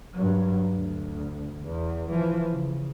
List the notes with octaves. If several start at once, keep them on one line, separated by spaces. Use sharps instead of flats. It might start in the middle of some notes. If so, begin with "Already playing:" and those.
G2 F#3
D2
E2
E3 F3
C#3